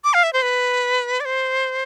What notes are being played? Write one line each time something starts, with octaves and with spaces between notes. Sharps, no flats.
D6
F5
E5
C5
B4
D5
C5